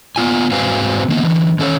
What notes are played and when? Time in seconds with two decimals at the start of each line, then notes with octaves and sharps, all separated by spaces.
0.16 B3 F4 G#5
0.51 G#2 C4 F#4 B4 F5 G#5
1.09 D#3 A#3 B3
1.22 D3 E3
1.59 D#3 C#4 A4 C5 C#5